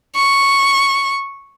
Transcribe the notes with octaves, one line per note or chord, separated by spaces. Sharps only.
C#6